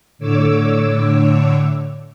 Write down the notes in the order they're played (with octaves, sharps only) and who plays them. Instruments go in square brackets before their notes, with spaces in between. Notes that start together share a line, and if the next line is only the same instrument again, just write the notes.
[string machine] A2 D3 C#5 D6 E6